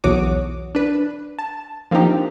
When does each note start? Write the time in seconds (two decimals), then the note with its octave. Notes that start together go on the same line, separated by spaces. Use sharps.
0.04 B1 E2 F#4 C#5 D6 D#6
0.75 D4 B4
1.39 A5
1.91 F3 A#3 C4 D4 D#4 G4